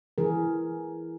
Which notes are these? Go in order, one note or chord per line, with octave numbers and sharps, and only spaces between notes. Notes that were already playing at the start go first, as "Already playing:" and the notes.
E3 G#4 A#4